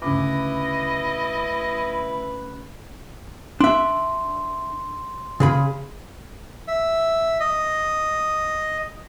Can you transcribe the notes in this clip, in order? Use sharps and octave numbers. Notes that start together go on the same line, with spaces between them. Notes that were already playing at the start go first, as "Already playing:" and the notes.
D2 C#3 E4 B4 D#5 D6
D4 E5 C6
C#3 G#4 B5
E5
D#5